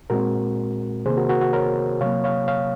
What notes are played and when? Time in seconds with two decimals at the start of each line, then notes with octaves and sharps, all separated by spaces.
0.10 A#2 G#3 C4 F#4 A#4
1.06 C3 D#3 A#3 G#4 C5
1.17 F#4 A#4
1.29 F#4 A#4
1.41 F#4
1.53 A#4 C#5
2.01 C3 F#3 A#3 C#5 F5
2.24 C#5 F5
2.48 C#5 F5